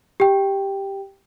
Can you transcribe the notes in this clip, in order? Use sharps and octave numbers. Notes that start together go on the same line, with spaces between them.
G4 G5